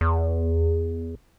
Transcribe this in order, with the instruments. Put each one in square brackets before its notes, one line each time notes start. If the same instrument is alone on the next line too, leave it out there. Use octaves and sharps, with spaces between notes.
[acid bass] E2